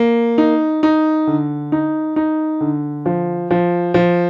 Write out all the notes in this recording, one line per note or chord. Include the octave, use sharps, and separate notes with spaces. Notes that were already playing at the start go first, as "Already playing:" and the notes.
Already playing: A#3
D#4
D#4
D3
D#4
D#4
D3
F3
F3
F3